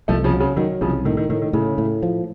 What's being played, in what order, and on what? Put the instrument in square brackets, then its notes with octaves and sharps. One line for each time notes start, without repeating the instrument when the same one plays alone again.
[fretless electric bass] C2 [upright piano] F3 A3
[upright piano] C#3 F3
[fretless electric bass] F#3
[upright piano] C#3
[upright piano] D#3 [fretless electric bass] F#3
[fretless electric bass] C2 [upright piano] C#3 F3
[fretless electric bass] A2 [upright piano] D#3
[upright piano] D#3
[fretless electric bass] A2 [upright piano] D#3
[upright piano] D#3
[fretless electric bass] A2 [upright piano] C#3
[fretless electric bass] A2
F3